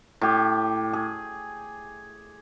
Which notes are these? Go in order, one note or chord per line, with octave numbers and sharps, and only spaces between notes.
A2 G4
G#4